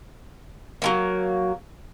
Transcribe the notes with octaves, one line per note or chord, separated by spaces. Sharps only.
F#3 G#3 A#3